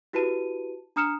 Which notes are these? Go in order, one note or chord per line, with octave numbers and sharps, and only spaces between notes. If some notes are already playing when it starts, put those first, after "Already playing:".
E4 F#4 G4 B4 A5 D#7
D4 A#5 D#6 F6 C#7 E7